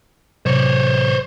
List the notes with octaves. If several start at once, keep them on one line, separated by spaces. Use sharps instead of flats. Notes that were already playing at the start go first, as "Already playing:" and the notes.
A1 C3 F#3 C5 C#5